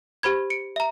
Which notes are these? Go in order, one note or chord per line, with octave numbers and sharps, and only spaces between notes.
G4 C5 B5 G#6
C#7 D7
E5 A#5